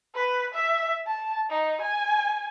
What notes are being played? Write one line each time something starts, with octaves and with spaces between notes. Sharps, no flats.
B4
E5
A5
D#4
G#5